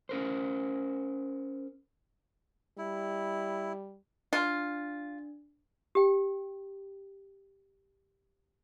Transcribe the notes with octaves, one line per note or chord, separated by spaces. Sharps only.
C#4 A#4 C5
G3 E4
D4 F4
G4 G5